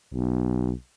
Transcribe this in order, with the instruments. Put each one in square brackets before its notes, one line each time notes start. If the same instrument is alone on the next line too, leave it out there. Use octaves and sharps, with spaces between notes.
[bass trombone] B1